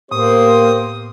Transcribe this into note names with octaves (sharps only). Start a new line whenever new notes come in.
A2 A#3 B3 G4 C5 D#6